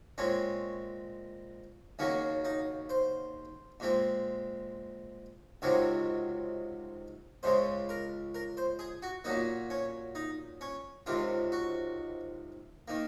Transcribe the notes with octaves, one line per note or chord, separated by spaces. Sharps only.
A#2 G#3 C4 C#4
D#2 C#3 F#3 A#3 C#4
D#4
C5
A#2 G#3 C4
C#2 C3 D#3 F#3 C4 C#5
C#2 C#3 G#3 C5
A#4
A#4
C5
G#4
F#4
A#2 F#3 A#3 D#4
C#4
D#4
C#4
C#2 C3 D#3 F4
F#4
D#3 A#3